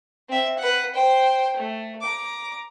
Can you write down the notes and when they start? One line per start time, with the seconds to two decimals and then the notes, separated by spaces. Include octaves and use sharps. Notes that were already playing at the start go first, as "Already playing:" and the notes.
0.29 C4 E5
0.58 B4 F#5
0.94 C5 G5
1.57 A3
2.01 A#5 D6